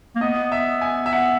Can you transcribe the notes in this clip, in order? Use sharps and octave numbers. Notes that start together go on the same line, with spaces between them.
A#3
B3 D#5
E5
G#5
E5
F#5